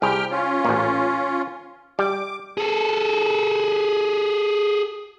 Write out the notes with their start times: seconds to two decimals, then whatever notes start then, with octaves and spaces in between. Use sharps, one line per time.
0.02 C2 G4 G#4 G5 F6
0.31 C#4 F4
0.65 A1 A#2
1.99 G3 D6
2.58 G#4 A4